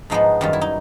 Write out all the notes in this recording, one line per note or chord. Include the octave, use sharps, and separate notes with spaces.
G#2 F3 G#3 B3 D#4
F#2 D#3 G3 F4
E4
D#4